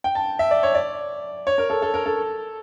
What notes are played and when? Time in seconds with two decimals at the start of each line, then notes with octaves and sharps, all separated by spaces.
0.04 G5
0.15 A5
0.39 E5
0.51 D5
0.63 C#5
0.75 D5
1.47 C#5
1.58 A#4
1.70 A4
1.82 A4
1.94 A#4
2.06 A4